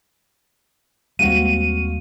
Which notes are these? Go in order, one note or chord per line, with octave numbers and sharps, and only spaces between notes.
D#2 G3 G#3 A#3 C4 F#4 F5 D#7